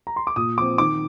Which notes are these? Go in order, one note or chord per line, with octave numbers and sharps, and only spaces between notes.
A#5
C6
D6
A#2 D#6
F3 C4 D6
D#3 D6